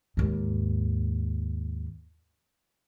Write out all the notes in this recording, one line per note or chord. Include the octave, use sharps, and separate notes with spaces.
D#2 G#2